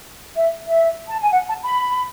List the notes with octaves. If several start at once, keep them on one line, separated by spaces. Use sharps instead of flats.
E5
E5
A5
G#5
F#5
A5
B5